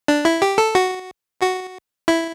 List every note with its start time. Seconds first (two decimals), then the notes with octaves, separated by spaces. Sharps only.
0.08 D4
0.25 E4
0.42 G4
0.58 A4
0.75 F#4
1.41 F#4
2.08 E4